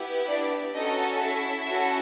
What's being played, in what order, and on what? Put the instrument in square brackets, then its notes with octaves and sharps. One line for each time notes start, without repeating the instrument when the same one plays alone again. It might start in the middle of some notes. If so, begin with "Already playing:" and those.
Already playing: [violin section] B3 E4 G4
D4 D5
C#4 D#4 F#4 A4 D#5
E4 E5
C#4 F#4 A4